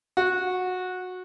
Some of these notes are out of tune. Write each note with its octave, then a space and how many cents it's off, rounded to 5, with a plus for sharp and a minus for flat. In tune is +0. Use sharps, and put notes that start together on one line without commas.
F#4 -15